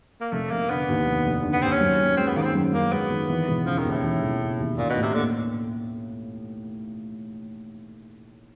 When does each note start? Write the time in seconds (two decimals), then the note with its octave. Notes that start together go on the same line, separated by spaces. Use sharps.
0.21 A#3
0.32 F1 A3
0.51 F1 A#3
0.69 D3 B3
0.89 D#2
1.06 F1
1.26 F1
1.43 D3
1.53 B3
1.62 D#2 C4
1.72 C#4
1.80 F#2
1.99 F#2
2.17 G#3 C4
2.27 B3
2.36 D#3 A#3
2.42 B3
2.45 C4
2.55 F#2
2.73 F#2 A#3
2.92 G#3 B3
3.11 D#3
3.30 E3
3.48 E1
3.66 C#3 F3
3.79 D#3
3.85 D#2
3.90 A2
4.03 E3
4.22 E1
4.40 C#3
4.59 D#2
4.77 A#2 C#4
4.90 B2
4.96 A2
5.02 C3
5.14 D3 A#3